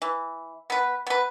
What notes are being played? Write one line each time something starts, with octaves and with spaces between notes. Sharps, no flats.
E3
B3 B4
B3 B4